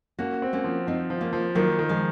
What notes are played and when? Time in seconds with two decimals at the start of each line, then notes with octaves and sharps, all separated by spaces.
0.19 A#3 C#4 F#4
0.42 C4
0.53 A#3 C#4
0.64 F3
0.87 F3 C4 D#4
1.10 F3
1.21 A#3 C#4
1.33 F3
1.55 D#3 F#3 A#3
1.79 D#3
1.89 F3 G#3